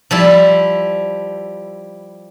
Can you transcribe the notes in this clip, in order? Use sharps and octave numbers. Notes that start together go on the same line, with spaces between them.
F3 G3 E4